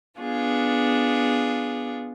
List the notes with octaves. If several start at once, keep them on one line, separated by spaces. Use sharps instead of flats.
B3 D4 F4 G#4